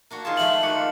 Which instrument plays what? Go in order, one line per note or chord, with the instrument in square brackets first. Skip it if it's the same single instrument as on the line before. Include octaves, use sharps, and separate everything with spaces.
[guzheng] A#3 D4 F#4
[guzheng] D#3 G#4 A5 [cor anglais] F4
[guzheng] F3 G#3 A3 [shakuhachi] E5 [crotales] F#7
[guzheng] D#3 [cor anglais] F#4 [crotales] D6 C#7
[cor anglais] F4